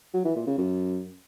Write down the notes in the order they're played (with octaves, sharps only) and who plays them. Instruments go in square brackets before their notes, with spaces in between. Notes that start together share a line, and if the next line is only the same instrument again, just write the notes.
[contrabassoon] F#3
E3
A#2
C#3
F#2